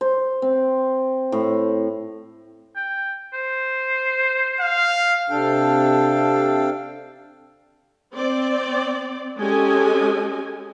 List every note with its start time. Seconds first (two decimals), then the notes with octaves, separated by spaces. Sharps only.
0.01 C5
0.42 C4
1.32 A2
2.76 G5
3.34 C5
4.60 F5
5.30 C3 D4 A4 F5 G5
8.15 C4 D5
9.39 G#3 C#4 G4 A4 D#5 G#5